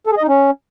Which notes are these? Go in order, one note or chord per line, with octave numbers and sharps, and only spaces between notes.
A4
G#4
D#5
D#4
C#4